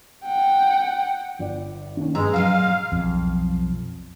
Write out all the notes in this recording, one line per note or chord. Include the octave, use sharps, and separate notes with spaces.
F#5 G5
G1 D5
D#3 A#3 C#4
G2 G#3 A#5 E6
A#2 F#3 G#3 F5
B1 F2